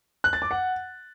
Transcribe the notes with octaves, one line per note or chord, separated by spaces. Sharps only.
F#6
A6
D6
F#5